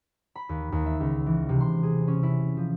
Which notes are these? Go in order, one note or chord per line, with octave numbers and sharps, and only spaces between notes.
B5
D#2
D#2
E5
C#2
E3
C3
C6
G#4
C#4
E4
F3